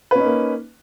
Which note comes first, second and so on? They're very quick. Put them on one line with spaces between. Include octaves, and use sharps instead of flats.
B4 C#4 D#4 A#3